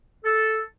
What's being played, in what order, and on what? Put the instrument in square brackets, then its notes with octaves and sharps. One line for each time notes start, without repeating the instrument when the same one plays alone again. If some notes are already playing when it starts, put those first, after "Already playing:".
[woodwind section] A4